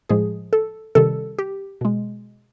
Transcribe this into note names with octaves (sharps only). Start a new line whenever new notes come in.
A2 F3 G#3 G#4
A4
C3 D#3 G3 A4
G4
B2 G#3